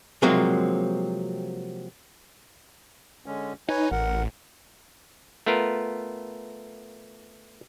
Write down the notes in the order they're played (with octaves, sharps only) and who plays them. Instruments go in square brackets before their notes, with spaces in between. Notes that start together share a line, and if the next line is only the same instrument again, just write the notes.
[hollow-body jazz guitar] C3 F3 F#3 G#3 A#3 C4
[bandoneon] D3 G#3 C#4
[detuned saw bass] D#4 [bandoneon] B4 C#5 G#5
[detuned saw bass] A1 [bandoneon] A#4 F#5
[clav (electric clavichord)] A3 B3 F4 A#4